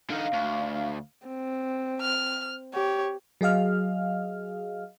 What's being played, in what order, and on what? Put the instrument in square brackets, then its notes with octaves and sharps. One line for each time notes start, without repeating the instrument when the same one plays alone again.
[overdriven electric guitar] D3 D#4 [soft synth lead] F5
[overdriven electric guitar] D2
[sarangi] C4
[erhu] F6
[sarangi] G4 [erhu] C#5
[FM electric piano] F#3 G#4 D#5 F5 F6